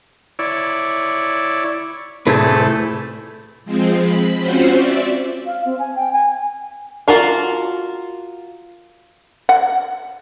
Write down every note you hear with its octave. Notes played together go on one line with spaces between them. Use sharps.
E4 C#5 D5
A2 C3 A3 E4 G#4 B4
F3 G#3 C4
B5
C4 C#4 F4 F#4 C5
D5 E5
F5
C4
G#5
G5
G#5
F4 F#4 A#4 F5
F#5